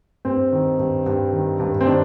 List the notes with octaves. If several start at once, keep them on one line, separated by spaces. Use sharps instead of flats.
G2 C4
D#3
G2
G2
D#3
G2
C4
D#3 D4